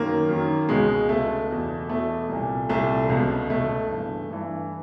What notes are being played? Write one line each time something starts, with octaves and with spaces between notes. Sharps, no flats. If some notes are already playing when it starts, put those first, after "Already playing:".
Already playing: F#2 D#3 A#3
F#2 D#3
C#2 B2 G#3
C#2 B2 A3
E2 B2
E2 B2 A3
C2 A#2
C2 A#2 A3
C#2 B2
C#2 B2 A3
G2 E3
G2 E3